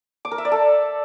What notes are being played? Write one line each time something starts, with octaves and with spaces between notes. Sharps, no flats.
D6
A#4
E5
D5
A4